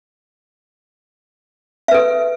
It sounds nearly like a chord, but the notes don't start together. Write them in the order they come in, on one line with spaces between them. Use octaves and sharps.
E5 B4 A4